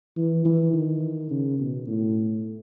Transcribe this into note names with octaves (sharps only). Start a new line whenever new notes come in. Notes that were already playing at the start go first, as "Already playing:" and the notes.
E3
E3
D#3
C#3
B2
A2